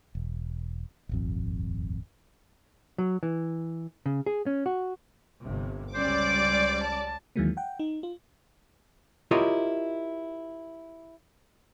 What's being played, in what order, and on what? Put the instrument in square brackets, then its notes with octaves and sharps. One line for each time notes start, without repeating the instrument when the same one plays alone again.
[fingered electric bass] E1
D#1 G#1 F2
[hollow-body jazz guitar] F#3
E3
C#3
G#4
C#4
F#4
[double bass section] G1 G2 C3
[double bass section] C#2 G3 C#4 [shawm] C5 [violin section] D5 D6
[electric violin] D7
A5
[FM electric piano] D#2 D#3 E3 F#3 G#3 A#3
F#5 G5
D#4
F4
[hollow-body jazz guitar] E4 F4 G4 A#4 C#5 D#5